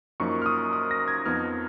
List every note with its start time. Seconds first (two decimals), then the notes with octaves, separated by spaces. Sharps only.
0.20 F#2 F3 A#3 D#4 C#6
0.42 F6
0.46 D#6
0.73 D#6
0.91 A#6
1.08 G#6
1.26 F2 F3 B3 D#4 F6